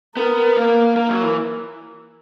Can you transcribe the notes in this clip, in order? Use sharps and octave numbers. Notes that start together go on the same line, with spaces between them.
B3 A#4
A#3
A#3 A#4
F#3
E3